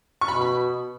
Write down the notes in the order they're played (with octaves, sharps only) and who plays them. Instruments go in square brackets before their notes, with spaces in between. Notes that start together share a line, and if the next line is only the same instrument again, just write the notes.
[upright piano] C#6
[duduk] B2 [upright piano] B5
[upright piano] B5